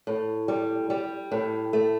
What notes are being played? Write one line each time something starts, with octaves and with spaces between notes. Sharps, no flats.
A2
G3
G3
A2
A3